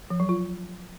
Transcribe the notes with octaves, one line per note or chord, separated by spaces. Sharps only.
F3
F#3
F4